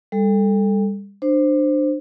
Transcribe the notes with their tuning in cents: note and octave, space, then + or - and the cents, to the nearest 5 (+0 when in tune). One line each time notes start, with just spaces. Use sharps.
G3 +30 A4 +0
D4 +25 C5 +0